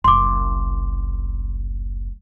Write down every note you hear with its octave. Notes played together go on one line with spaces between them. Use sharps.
F#1 C2 C6 D6